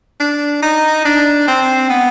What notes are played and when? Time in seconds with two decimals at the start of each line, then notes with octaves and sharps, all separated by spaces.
0.20 D4
0.62 D#4
1.05 D4
1.47 C4
1.90 B3